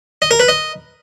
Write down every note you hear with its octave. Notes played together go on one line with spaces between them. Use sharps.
D#5
A#4
B4
D#5